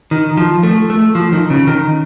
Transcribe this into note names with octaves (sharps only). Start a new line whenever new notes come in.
D#3
F3
A3
A3
F3
D#3
C#3
D#3